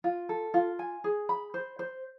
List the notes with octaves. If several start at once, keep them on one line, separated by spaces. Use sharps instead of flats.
F4
A4
F4
G#5
G#4
B5
C5
C5